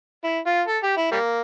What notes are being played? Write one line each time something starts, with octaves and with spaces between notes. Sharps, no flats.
E4
F4
A4
G4
E4
G3 A#3